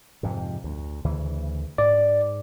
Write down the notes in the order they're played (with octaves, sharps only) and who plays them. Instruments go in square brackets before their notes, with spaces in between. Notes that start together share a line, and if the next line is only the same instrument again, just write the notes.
[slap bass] F2 G#2 C3
D2
D2 C#3 E3
[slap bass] G#2 [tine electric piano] D5